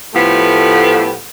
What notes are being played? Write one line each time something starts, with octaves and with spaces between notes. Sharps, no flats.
A2 F3 A3 B3 G4